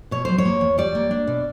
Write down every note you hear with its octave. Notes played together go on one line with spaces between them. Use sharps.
B2 C#5
F#3 C5
C#5
A#3
E2
G3 D5
A#3
D4
B2